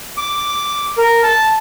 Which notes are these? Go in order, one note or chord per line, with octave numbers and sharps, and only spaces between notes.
D6
A#4
A5